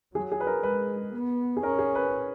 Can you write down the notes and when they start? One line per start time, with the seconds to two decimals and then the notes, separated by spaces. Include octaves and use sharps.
0.15 F#3 G#4
0.32 G#4
0.40 B4
0.47 A#4
0.63 G#3 B4
1.14 B3
1.57 G#4
1.63 C#4 A#4
1.79 G#4
1.95 B4